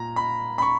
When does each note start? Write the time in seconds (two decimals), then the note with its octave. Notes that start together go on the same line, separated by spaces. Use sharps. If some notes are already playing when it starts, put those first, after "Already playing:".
Already playing: A#2 A#5
0.16 B5
0.58 B5
0.62 C#6